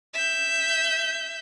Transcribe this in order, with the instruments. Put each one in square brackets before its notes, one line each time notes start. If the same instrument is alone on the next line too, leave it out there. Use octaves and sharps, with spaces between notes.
[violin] E5 G6